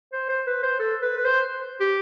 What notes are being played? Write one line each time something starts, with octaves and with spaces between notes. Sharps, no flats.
C5
C5
B4
C5
A4
B4
B4
C5
G4